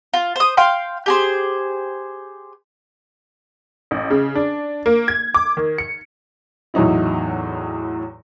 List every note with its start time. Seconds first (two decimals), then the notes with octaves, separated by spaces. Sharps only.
0.14 F4
0.36 C5 D#6
0.57 F5 G5 C6
1.06 G4 G#4 C5
3.91 A1
4.10 C#3
4.35 D4
4.86 A#3
5.08 G#6
5.34 D6
5.57 D#3
5.78 C#7
6.74 E2 A2 F#3 D#4 E4